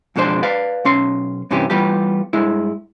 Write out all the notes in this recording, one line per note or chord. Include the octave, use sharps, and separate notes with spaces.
F2 B2 G#3 D4 C5
B4 D5 F5
B1 C#4 C6
G2 C3 E3 C#4 G4
E3 G3 B3 F4 G4
G2 G#3 E4